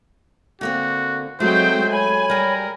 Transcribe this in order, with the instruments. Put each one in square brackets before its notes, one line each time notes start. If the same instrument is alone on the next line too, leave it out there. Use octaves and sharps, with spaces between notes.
[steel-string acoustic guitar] D3 A#3 C4 [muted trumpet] F#4
[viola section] F#3 G#3 G5 [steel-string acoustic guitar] A3 [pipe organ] C4 [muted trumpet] C5
[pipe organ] C#5 B5 [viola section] G#5
[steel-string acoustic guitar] G3 G#4 [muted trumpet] A#4